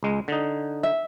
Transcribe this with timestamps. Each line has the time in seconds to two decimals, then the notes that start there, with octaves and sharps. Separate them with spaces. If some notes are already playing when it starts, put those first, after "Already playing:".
0.03 C#2 G#3
0.28 D3 D#4
0.83 E5